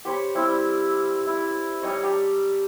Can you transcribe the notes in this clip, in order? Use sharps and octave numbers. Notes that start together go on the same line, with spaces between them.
G4 C5 C#5 B5
G3 C4 E4 E6
E4
G3 D#4 C#5 D#5
D4 G4 A#5